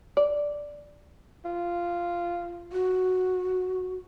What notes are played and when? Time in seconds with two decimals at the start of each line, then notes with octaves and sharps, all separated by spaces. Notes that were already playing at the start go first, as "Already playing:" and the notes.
0.17 D5
1.45 F4
2.72 F#4